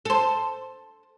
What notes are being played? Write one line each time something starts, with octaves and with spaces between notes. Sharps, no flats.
A4 C5